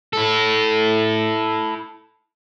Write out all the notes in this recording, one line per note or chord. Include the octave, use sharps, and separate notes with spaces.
E4 A4